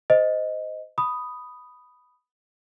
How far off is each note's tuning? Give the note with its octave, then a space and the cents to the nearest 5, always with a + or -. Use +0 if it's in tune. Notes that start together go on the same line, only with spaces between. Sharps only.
C5 -25 D#5 +0
B5 +0 D#6 +0